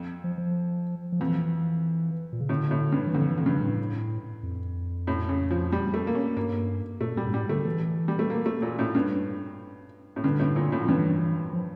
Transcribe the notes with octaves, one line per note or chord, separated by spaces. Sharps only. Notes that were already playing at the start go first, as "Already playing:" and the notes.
Already playing: F2
F3
F3
F3
F2 E3
A#2
C#3
A2 D3
A2
G2
E3
F2 D3
E3
F2 D3
G2 C#3
A2
F2
A2
C#3
F3
G3
A3
A#3
C#4
G2 A#3
A#2 A3
A#2 G3
G2
A2 G3
D3 A3
E3
G3
A3
A#3
A3
A#2
A2
G2
A2
G2 D3
A2
A#2
A2
F2
G2 E3
F3